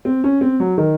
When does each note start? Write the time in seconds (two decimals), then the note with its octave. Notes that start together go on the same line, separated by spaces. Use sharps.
0.05 C4
0.24 C#4
0.41 C4
0.60 F#3
0.78 D#3